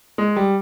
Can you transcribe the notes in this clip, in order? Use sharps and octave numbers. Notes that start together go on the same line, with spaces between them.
G#3
G3